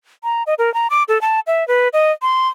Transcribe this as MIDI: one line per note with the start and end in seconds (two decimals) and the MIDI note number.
0.24 0.43 82
0.47 0.54 75
0.59 0.73 70
0.74 0.87 82
0.90 1.03 86
1.08 1.21 69
1.21 1.40 81
1.47 1.66 76
1.68 1.88 71
1.93 2.12 75
2.22 2.48 84